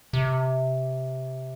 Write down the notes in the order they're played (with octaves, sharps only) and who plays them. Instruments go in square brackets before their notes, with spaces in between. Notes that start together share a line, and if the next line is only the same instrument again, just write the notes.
[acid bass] C3